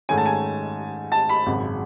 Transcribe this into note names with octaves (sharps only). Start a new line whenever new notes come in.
G#2 D#3 A3 C#4 G#5
A5
G#5
A5
B5
G#1 F#2 C#3